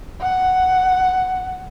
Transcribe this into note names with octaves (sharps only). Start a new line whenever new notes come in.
F#5